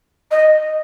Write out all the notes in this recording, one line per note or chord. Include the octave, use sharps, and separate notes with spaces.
D#5